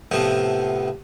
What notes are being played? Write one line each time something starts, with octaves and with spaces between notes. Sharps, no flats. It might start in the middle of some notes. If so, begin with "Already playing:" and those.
A2 C3 F3 B3